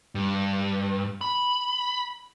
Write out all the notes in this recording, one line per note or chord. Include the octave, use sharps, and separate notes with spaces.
G2
B5